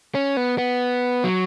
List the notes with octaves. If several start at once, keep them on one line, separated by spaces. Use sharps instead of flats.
C#4
B3
B3
F#3